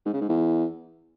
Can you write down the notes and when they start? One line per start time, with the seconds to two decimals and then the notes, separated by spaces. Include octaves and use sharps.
0.06 G#2
0.13 C#3
0.21 G#2
0.29 E2